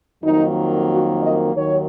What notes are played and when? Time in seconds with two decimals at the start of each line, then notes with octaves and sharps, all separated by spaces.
0.22 F2 D#3 F#3 A#3 D#4
0.88 F#4
1.20 D#5
1.53 D#2 D#3 F#3 C#5